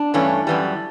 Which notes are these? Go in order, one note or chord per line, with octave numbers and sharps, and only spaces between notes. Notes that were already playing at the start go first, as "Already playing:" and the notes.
Already playing: D4
G2 E3 A3 C#4
F#2 E3 G3